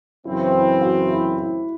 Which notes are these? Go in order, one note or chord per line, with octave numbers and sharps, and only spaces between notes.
F#2 C#3 E3 C4 E4
E4
F#4
E4
E4